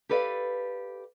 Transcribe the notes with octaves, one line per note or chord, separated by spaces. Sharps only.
G4 A4 B4 D5 E5 F5